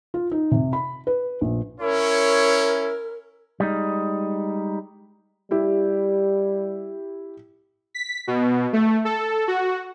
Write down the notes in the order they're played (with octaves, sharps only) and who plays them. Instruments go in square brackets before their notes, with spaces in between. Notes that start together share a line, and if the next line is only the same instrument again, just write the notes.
[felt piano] F4
D#4
C3
B5
B4
A#1
[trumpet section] C#4 E4 C#5 [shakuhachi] A#4
[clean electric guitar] G3 G#3 D#4
[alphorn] G3 [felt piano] E4 G4
[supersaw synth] B6
B2
A3
A4
F#4